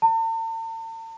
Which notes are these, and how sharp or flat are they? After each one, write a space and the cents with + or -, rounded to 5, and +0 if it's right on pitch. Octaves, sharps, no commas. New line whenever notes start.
A5 +45